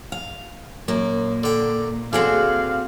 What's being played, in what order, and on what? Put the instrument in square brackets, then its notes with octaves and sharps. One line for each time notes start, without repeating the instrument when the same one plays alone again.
[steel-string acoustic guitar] F5
[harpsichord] F#2 [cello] A#2 [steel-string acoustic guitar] A#3
[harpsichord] D3 G5
[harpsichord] D3 [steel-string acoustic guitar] C4 F#4 G#4 [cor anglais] F5